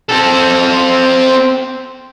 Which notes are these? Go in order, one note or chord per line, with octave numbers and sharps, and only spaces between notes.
C4 A4